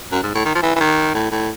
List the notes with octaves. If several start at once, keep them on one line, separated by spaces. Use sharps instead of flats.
F#2
G#2
A2
D#3
F3
E3
E3
D#3
A2
A2